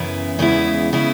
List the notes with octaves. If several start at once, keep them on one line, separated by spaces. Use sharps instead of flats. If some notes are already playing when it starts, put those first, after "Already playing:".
Already playing: F#2 C#3 E3 B3 E4
E2 C#3 G#3 B3 E4
C#3 G#3 B3 E4